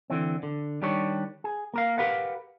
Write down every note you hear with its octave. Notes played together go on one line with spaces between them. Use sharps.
D3 E3 C4
D3
D#3 G3 D4 G4 C#5
G#4
A#3 A#4 F5
G4 A#4 B4 F5 F#5